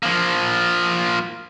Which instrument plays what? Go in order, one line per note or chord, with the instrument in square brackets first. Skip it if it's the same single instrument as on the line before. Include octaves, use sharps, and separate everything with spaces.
[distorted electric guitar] F3 A#3